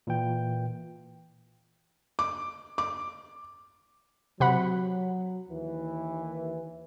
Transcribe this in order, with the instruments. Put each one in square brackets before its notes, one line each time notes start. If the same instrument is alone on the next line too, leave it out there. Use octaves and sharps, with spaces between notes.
[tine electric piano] A#2 E3 G5
[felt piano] D6
D6
[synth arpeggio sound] C3 F#5 B5 [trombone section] F#3
[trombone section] D#2 E3